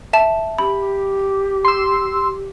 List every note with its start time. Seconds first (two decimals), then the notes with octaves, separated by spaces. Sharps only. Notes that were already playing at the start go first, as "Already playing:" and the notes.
0.13 E5 A5 E7
0.58 G4 B5
1.65 C6 E6